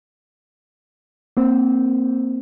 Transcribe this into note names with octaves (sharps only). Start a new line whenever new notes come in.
A#3 C4